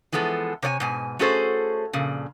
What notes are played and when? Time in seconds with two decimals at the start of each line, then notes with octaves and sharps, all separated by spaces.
0.12 E3 F3 G#3 B3 A4
0.62 C3 C#5 D5 G#5
0.80 G#2 B2 G#5
1.19 A3 C#4 F#4 G#4 A4 C5
1.93 F2 A#2 C#3